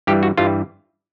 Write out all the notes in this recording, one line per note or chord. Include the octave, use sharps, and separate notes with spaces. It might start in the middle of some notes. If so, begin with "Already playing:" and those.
G2 E3 G3 G4
F#4
G2 E3 G3 F4